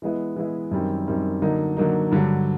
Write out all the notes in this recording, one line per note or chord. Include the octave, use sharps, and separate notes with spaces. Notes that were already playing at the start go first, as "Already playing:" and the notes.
E3 G#3 B3 E4
E3 G#3 B3 E4
F#2 D#3 G3 C4
F#2 D#3 G3 C4
D3 F#3 A#3 D#4
D3 F#3 A#3 D#4
G2 D3 F#3